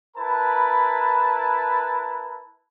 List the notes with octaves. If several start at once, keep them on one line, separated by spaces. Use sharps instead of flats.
E4 A#4 B4 A5 B5